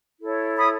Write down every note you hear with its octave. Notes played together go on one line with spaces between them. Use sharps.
E4 A4 C#5
B5 D#6